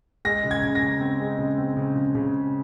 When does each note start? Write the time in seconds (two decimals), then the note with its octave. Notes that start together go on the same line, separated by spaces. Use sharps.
0.25 G#3 A#6
0.44 C#3
0.51 G#6
0.63 C#3
0.75 A#6
0.82 C#3
1.00 C4
1.20 G#3
1.38 C#3
1.58 C4
1.77 C#3
1.96 C#3
2.15 C#3